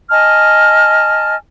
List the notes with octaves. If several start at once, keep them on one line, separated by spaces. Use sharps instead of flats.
D#5 G#5 A5 F6